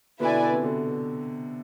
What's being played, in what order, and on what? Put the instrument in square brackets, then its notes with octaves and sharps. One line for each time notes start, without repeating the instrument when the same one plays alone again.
[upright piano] B2 D3 [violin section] E4 B4 D5 G#5
[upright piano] C3
B2 D3